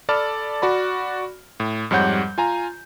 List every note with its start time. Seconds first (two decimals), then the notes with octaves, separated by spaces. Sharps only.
0.09 A4 D5 A5 B5 F6
0.62 F#4 D5 B5
1.60 A2
1.91 F2 G#2 G3 C#5 F#5 G6
2.38 F4 G#5 A#5